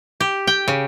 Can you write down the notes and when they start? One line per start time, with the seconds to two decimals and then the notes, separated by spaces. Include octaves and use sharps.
0.20 G4
0.47 G5
0.68 C#3